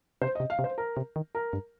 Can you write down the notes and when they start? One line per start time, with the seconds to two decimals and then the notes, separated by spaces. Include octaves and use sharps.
0.22 C3 C5
0.35 D#5
0.40 C3
0.50 F5
0.59 C3
0.64 C5
0.78 A#4
0.97 C3
1.16 D#3
1.35 A#4
1.53 G2